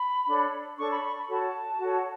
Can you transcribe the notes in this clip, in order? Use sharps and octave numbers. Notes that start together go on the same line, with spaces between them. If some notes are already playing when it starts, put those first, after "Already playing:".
Already playing: B5
D4 A4 C#5
D4 A4 C#5 C#6
B5
C#6
B5
F#4 A4 C#5 A5
F#4 A4 C#5